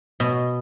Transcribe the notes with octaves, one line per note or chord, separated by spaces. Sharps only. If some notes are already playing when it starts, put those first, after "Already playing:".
B2